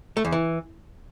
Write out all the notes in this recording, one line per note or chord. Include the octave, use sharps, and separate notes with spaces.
A3
E2
E3